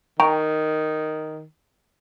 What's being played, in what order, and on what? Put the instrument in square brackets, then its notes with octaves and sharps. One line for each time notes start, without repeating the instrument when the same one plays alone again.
[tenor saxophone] D#3 [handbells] G5 A#5 C#6